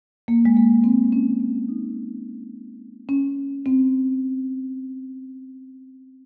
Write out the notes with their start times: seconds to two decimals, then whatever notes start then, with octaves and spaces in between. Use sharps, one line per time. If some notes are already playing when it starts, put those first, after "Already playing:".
0.28 A#3
0.45 G#3
0.57 A#3
0.84 C4
1.12 C#4
1.40 C4
1.69 D#4
3.09 C#4
3.66 C4